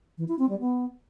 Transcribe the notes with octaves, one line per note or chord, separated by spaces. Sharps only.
E3
E4
C4
G3
B3